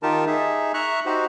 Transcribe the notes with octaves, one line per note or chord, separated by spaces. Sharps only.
D#3 D#4 F4 G4 A#4 A5
D#4 G#4 E5
E5 A#5 C#6 F#6
D#4 F#4 G4 C5